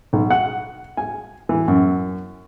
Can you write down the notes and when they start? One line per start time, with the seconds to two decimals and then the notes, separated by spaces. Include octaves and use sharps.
0.13 B1
0.30 F#5
0.97 G#5
1.49 E3
1.68 F#2